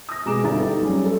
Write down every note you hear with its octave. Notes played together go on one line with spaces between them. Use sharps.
D#6 A#6
B2 G#3 G#4 A#5 D6 E7
G1 D3 E4 E5 A#5 A6
D#4 G4 A4
F#3 G3 C#4 G#4
A3 A4